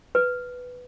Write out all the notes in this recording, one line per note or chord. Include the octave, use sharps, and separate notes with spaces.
B4